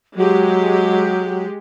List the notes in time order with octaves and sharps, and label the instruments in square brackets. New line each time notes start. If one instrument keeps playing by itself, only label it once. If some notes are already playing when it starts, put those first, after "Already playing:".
[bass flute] F#3 [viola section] G#3 G4